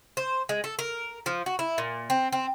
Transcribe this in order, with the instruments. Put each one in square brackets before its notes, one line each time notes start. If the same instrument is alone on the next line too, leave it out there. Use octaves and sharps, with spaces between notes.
[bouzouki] C5
G#3
A4
A#4
F3
F#4
E4
A#2
C4
C4